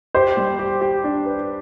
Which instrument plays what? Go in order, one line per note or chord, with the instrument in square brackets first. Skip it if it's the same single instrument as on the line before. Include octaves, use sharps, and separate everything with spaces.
[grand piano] G4 [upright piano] C5
[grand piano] G3
G4
G4
D4
B4